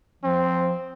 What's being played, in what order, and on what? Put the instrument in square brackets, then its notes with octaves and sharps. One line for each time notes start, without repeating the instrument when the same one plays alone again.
[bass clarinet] F3 [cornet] C4